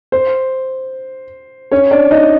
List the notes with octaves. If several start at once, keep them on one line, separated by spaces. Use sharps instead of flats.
C5
C#4 C#5
D4 D5
D#4 D#5